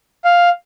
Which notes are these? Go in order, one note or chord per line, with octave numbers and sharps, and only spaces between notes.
F5